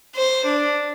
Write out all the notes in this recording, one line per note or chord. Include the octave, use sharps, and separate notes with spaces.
C5
D4